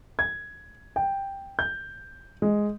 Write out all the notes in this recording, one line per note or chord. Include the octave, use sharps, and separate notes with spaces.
G#6
G5
G6
G#3